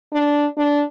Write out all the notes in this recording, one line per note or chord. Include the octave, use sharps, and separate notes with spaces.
D4
D4